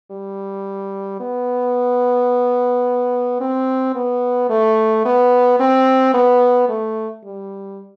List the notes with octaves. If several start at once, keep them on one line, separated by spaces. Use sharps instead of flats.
G3
B3
C4
B3
A3
B3
C4
B3
A3
G3